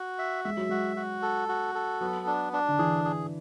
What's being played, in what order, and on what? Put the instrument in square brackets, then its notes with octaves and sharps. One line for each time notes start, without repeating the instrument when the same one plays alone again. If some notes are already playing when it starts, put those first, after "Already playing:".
Already playing: [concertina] F#4
E5
[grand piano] G#3 [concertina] E5
[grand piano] F#3
[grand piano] G#3 [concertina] F#4
[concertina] F#4
A4
F#4
A4
[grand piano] F#3 [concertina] B3
[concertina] D4
D4
[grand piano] D3
[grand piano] E3 [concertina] G#4
[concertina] G#4